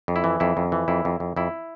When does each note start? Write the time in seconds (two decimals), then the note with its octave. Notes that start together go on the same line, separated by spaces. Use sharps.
0.08 F2
0.16 E4
0.24 E3
0.40 F2 E4
0.57 F2
0.72 E3
0.88 F2 E4
1.05 F2
1.20 F2
1.36 F2 E4